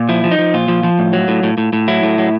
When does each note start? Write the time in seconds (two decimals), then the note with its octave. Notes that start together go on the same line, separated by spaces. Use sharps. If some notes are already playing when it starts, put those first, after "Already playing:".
Already playing: A#2
0.09 F3 E4
0.24 F3
0.31 D#4
0.38 F3
0.54 A#2 F4
0.68 F3
0.83 F3
0.99 A2
1.13 F#3
1.28 A2
1.43 A2
1.58 A2
1.73 A2
1.88 F#3 E4
2.03 A2
2.18 F#3